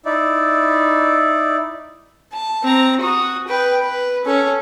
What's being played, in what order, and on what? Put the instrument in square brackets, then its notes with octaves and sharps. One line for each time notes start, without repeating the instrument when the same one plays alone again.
[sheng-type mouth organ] D#4 E4 D5
[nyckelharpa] A5
C4 A#5
F#4 D#6
B4 G5
B4
C#4 A4